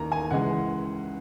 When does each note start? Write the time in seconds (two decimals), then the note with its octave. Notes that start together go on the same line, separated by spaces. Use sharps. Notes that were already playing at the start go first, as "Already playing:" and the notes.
Already playing: D#2 D#3 A#3 A#5
0.12 G#5
0.31 C#2 C#3 E3 G#3 F#5